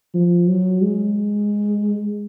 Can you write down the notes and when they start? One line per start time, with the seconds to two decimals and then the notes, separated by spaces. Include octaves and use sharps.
0.14 F3
0.48 F#3
0.82 G#3